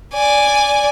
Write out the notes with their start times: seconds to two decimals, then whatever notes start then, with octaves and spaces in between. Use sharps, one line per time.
0.14 D5 G#5